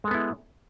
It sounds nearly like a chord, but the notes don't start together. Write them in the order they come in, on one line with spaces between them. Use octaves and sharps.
G#3 A4 B3 E4